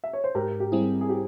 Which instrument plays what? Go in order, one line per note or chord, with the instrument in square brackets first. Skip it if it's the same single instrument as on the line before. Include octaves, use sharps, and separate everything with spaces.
[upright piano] E5
C#5
C5
[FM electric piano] G#2 [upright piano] G4 A#4
[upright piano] G4
[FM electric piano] G3 C4 E4 [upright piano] G#4
[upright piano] G#4
G4